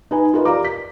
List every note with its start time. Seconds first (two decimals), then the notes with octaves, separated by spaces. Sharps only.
0.11 D#4 B4 G#5
0.34 F4 G4 A#4 B4 D#5
0.45 G4 A#4 D5 F5 A#5 D6
0.65 B6